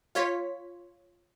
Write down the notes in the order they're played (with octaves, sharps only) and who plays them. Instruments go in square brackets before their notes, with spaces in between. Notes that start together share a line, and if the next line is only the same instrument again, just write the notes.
[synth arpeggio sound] F4 C#5 B6